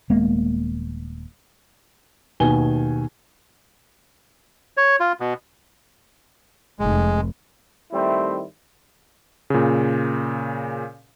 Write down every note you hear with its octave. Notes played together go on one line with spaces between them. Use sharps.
D#1 G#3 A#3 B3
D#2 B2 G#5 G7
C#5
F4
B2
F1 G#3
D#3 G3 A3 C4 E4
A#2 C#3